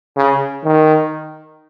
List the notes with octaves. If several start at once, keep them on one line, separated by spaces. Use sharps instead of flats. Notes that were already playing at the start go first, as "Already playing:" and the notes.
C#3
D#3